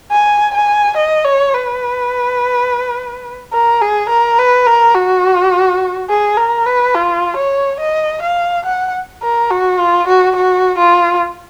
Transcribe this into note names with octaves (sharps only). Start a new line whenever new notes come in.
G#5
G#5
D#5
C#5
B4
A#4
G#4
A#4
B4
A#4
F#4
G#4
A#4
B4
F4
C#5
D#5
F5
F#5
A#4
F#4
F4
F#4
F#4
F4